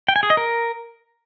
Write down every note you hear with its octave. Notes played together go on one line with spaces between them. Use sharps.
G5
G#5
G#4
D#5
A#4